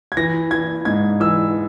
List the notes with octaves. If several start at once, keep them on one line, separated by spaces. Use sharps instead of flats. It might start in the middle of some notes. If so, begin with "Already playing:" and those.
G#6
E3 A#6
E3 G#6
G#2 G#6
E3 E6